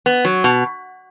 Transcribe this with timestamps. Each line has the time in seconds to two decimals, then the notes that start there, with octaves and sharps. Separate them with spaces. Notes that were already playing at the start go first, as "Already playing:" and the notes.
0.06 B3
0.25 F#3
0.44 B2